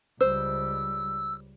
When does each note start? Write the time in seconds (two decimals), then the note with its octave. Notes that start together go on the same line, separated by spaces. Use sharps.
0.21 C#2 G3 C5 E6